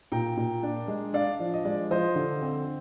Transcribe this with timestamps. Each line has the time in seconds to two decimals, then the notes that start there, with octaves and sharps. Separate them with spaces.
0.12 A#2 G5 A#5
0.37 A#2
0.63 D4
0.88 G#3
1.13 D4 D5 F5
1.40 F3
1.53 D#5
1.65 G#3 D5
1.90 F3 C5 D#5
2.15 D3
2.41 C4